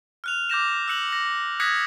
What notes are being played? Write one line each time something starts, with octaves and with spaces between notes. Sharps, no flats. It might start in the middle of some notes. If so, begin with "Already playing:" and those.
F6 F#6 F7
D6 G6 A#6 E7
E6 F#6 C#7 F#7
A#6
D#6 F#6 G#6 A#6 B6 C#7